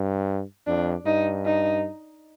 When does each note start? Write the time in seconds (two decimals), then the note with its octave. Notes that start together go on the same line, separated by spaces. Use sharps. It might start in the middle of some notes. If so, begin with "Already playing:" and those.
Already playing: G2
0.67 F2 D4
1.06 G2 D#4
1.46 D#4